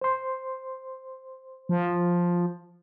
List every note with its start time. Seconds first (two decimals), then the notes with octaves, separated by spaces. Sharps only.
0.01 C5 C6
1.69 F3